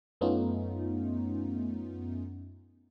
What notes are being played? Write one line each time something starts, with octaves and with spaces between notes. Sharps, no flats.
F#2 A3 B3 C#4 D#4 F4